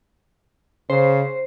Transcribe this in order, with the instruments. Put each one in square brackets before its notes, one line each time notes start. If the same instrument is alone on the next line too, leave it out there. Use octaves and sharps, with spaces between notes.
[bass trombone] C#3 [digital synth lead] C5